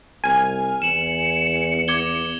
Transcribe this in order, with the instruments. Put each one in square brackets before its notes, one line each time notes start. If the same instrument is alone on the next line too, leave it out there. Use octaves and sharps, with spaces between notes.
[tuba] C2 [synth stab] G#5 [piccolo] F6
[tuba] E2 [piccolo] C#7 [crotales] E7 F#7
[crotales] D6 G#6 G7